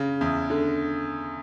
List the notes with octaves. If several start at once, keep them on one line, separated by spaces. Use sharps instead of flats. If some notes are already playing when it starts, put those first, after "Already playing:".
Already playing: C#3
E2
D3